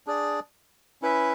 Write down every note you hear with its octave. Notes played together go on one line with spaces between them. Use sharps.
D4 G#4 D5
C#4 E4 B4 E5